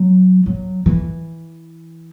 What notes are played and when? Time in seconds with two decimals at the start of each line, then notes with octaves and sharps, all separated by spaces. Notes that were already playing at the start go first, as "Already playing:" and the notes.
Already playing: F#3
0.46 F#3
0.86 E3